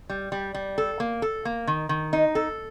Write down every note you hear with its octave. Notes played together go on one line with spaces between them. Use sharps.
G3
G3
G3
A4
A#3
A4
A#3
D#3
D#3
D#4
A4